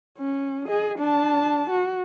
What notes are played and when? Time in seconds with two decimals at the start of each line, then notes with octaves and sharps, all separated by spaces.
0.18 C#4
0.66 G#4 D#5
0.99 D4 A5
1.70 F#4